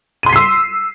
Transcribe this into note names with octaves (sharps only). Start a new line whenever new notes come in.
C6 E6 B6 C7 D#7